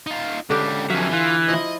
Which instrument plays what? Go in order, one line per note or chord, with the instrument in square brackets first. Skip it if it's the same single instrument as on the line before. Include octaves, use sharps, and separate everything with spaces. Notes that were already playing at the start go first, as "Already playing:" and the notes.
[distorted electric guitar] D#4 F4
[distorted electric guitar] C#2 G3 [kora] D3 G4
[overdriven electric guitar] F2 F#3 [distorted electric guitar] E5 G#5 [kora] F5
[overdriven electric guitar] E3 [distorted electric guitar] F4
[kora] F3 E4 [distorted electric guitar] D#5